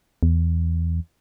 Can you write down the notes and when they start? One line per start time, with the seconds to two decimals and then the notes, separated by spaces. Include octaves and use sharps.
0.23 E2